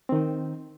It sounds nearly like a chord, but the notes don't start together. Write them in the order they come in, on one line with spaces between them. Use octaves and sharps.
C4 D#3 D#4